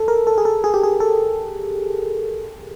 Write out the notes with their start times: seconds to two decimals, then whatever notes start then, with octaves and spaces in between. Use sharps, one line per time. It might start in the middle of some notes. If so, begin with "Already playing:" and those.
Already playing: A4
0.08 A#4
0.27 A4
0.38 G#4
0.45 A4
0.64 G#4
0.74 G4
0.83 G#4
1.00 A4